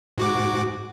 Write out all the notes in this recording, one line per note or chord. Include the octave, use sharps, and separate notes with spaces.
G#2 F#4 D6